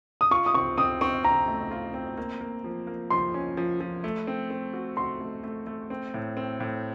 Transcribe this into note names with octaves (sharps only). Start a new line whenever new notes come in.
D#6
F4 C#6
D#6
C4 C#6
C4 D#6
C4 C#6
C4 A#5
A3
F4
C4
A#3
A#3
F3
A#3
F3 C6
C#4
F3
F3
A3
C4
C4
F#4
F#4 C6
A3
A3
A3
C4
A2
C4
A2